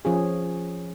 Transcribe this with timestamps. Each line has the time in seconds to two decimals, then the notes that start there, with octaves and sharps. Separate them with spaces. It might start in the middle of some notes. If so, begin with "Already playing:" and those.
0.05 F3 C#4 G#4